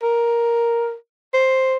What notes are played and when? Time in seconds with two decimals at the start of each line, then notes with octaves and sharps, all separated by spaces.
0.03 A#4
1.34 C5